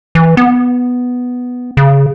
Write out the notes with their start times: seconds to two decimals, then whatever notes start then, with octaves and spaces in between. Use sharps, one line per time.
0.15 E3
0.37 B3
1.77 C#3